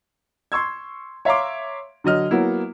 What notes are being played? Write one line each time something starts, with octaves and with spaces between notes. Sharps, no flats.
C6 C#6 E6 G#6
C#5 E5 F5 A#5 C6 D6
D3 F#3 D#5 F6
F#3 A#3 B3 E4